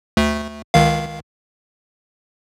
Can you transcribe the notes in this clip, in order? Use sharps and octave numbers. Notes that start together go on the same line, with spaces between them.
D2 A3
C#2 D#3 F5